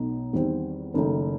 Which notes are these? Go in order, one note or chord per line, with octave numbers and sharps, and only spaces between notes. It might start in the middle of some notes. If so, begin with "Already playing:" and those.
Already playing: B1 B2 A3 D#4
E2 D#3 G3 C4
F#1 F#2 D#3 A3 D#4